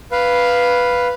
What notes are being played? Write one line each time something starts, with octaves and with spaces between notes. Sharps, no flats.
B4 F5